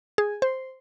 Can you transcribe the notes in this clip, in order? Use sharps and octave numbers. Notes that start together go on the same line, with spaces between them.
G#4
C5